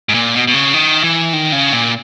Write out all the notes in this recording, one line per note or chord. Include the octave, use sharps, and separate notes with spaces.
G#2
A#2
B2
B2
C#3
D#3
E3
D#3
C#3
A#2